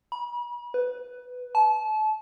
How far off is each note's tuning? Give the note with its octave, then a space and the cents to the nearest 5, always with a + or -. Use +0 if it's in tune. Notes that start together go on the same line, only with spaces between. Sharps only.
B5 -40
B4 +10
A5 -30